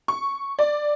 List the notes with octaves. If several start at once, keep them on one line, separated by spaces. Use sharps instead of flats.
C#6
D5